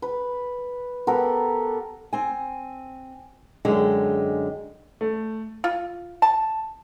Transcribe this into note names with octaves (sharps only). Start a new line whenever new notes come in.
B4
B3 G4 A4 A#4
C4 G#5
F#2 D3 G#3 G4
A3
F4
A5